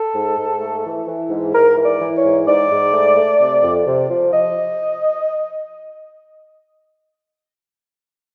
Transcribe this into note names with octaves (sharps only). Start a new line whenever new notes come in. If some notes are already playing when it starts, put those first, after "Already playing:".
Already playing: A4
G#2
G#2
A3
E3
E3
G#2
G#2 A#4
E3
D5
E3
C#5
G#2
G#2 D5
G#2
A3
A3
C3
F2
C3
F3
F3 D#5